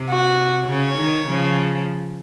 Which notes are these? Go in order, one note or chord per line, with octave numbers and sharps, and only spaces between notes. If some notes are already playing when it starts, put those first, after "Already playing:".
Already playing: C3
F#4
C#3 C#5
D#3
C#3 F3